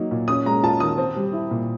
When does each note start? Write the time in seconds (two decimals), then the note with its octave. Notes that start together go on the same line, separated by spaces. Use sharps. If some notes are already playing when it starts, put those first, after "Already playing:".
Already playing: F#3 A#3 D#4
0.11 A#2
0.28 C#4 D#6
0.46 G#3 A#5
0.63 F4 A5
0.80 D#3 D#6
0.98 C4
1.16 G3
1.33 E4
1.51 A#2